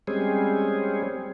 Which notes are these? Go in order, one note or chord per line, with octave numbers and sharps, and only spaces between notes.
G3 G#3 C4 C#4 G#4